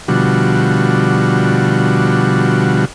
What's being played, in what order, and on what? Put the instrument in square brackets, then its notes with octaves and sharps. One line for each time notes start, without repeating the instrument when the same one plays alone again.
[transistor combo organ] B2 D3 F3 G3 F#4